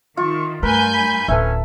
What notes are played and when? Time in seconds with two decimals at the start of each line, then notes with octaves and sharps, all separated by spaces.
0.17 D#3 F4 C#6
0.63 G2 A3 A#4 B4 G#5 G6
0.94 B5
1.28 D1 C#4 A4 B4 E5